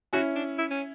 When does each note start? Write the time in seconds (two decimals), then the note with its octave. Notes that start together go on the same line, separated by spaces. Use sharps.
0.13 C#4 E4 F#4
0.36 D4
0.58 E4
0.71 C#4